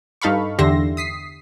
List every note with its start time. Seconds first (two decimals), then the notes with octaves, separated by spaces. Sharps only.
0.22 G2 D#4 A4 F5 B5 C#6
0.59 E2 D3 G4 E5 C6 A#6
0.97 D#6 B6 C7